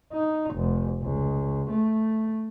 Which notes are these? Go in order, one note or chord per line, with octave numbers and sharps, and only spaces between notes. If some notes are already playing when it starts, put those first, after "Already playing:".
D#4
F1
C#2
A3